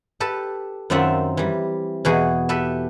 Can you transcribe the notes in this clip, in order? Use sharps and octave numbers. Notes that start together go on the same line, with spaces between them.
G4 A4 B4 A5
F#2 D#3 C4 F4 E5 F#5
E3 G3
E2 B2 E3 F#4 G#4
G4 A4 B4 E5